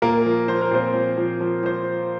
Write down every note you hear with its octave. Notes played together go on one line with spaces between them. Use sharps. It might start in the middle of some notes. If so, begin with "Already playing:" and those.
A#2 A#3 A#4
F3
F3 C5
A#4
A#2 C4 C5
F3
F3
F3
F3 C5